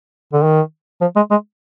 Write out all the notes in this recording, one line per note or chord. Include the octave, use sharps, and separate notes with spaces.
D3
D#3
F3
G#3
G#3